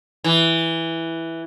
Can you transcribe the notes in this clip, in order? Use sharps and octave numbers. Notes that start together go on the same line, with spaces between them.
E3